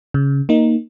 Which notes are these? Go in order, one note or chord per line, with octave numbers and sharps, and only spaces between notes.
C#3
A#3 D#4